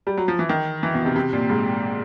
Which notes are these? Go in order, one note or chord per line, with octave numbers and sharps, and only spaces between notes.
G3
F#3
F3
E3
D#3
E3
B2
C3
C3
A#2
G#2